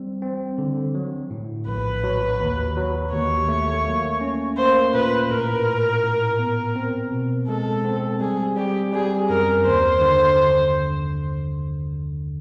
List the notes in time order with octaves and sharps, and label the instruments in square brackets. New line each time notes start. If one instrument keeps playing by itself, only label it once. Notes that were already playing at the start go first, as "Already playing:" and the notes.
Already playing: [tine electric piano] G3 C4
C4
D3
F#3
A2
[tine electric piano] A#1 [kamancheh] B4
[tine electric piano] F#3
D#2
F#3
[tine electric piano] D#2 [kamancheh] C#5
[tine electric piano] A3
A#3
C#4
[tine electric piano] A#3 [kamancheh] C5
[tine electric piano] A#2 [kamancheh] B4
[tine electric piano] A2 [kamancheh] A#4
[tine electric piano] A2
A2
B3
C4
B2
[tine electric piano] G#3 [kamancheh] A4
[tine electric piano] C4
[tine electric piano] G3 [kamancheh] G#4
[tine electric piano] G3 [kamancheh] G4
[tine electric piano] G3 [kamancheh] G#4
[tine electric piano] F#2 [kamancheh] A#4
[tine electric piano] D#2 [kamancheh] C5
[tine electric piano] D3